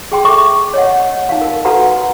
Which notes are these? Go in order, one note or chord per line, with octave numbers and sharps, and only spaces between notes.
G#4 G5 C6
A4 E5 G5 C#6 D6
C#5 D#5 F#5
D#4 F5
A#4
F#4 A4 B4 F#5 A#5